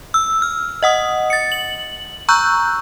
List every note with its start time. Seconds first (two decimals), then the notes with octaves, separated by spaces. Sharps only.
0.14 E6
0.42 F6
0.83 D#5 F#5 D#6
1.30 A6 C#7
1.52 F#7
2.29 A#5 C#6 E6 F#6 G6